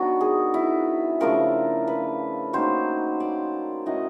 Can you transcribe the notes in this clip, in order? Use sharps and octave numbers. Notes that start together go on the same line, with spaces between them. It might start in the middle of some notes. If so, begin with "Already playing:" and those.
Already playing: D#3 F#3 B3 D4 F#4
G#4
E4
C#3 F3 A3 D4 A#4
B4
D#3 F#3 A#3 C#4 C5
D5
A2 F#3 A3 C#4 D#5